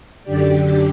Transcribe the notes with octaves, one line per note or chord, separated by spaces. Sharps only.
F#2 D3 G4 D5